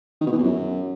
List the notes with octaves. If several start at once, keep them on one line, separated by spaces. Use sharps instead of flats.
D#3
B2
E3
E2
F#2